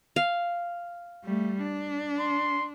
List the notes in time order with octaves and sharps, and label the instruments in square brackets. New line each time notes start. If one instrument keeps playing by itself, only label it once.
[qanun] F5
[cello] G3 A3
D4
[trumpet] C6